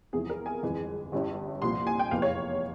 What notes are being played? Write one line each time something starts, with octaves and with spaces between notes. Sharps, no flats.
E2 C3 F3 G#3 E4 G#4
A#4
G#5
G1 F2 E3 G#3
G1 G2 G3 C#4 E4
C2 A#2 F3 C6
G#5
G5
F1 E2 E3 A#3 F5
C#5